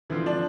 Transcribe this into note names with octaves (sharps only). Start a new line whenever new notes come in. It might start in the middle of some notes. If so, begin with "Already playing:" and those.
D3 E3 F3 C4 F4
D4